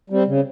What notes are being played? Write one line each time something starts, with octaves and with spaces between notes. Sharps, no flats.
G3 C4
C#3